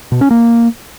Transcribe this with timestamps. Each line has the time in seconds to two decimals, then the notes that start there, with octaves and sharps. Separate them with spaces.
0.12 B2
0.21 C#4
0.31 A#3